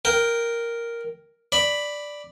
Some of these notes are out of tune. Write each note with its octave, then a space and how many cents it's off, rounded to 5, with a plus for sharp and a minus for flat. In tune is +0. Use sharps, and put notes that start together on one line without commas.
A#4 +0 G5 +5
D5 +0 B5 +0